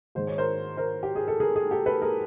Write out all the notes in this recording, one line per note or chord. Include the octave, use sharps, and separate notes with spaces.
G#2 D#3 G#3 C5
C#5
A#4 C5
A#4 C5
G4
G#4
A4
G#4 A#4
G#4
G4 A4
A4 B4
G#4 A#4